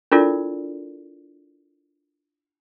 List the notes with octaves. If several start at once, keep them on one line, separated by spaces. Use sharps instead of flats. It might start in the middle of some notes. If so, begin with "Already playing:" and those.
D4 E4 F4 A4 A#4 D5